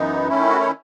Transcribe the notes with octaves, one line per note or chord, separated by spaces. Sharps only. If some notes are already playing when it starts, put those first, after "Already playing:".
Already playing: F#2 E3 B3 D#4
D#3 A3 C#4 E4
F#4
C#5